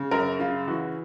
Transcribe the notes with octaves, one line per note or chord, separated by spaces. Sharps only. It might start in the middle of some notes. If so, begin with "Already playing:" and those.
Already playing: C#3
F#2 A#4
C#3 F4
E3 F#4